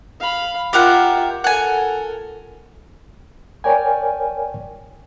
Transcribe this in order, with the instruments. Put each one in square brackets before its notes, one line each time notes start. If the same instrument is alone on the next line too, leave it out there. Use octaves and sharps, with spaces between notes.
[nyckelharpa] F5 B5
[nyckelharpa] F4 E5 [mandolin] G4 A#4 F#5
[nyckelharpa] A4 A#4 [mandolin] F#5 G#5
[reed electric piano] A#4 C#5 D5 G5 G#5